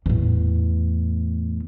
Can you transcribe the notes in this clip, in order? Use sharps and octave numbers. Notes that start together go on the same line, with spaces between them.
E2 A2